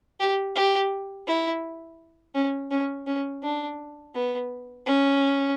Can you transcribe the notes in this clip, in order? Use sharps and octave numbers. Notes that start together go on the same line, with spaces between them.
G4
G4
E4
C#4
C#4
C#4
D4
B3
C#4